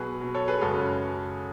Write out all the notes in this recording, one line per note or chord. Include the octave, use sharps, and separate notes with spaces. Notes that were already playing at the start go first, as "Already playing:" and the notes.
Already playing: B2 F#3 G#4 B4
B2 F#3
A4 C#5
G#4 B4
F#2 C#3 G#3 F#4 A4
C#4